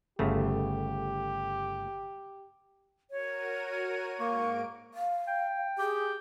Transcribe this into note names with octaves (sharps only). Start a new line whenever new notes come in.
G1 C#3 A3 G4
F#4 A#4 C#5 D#7
G#2 A#3 C#6 D7
F5
G5
G4 G#4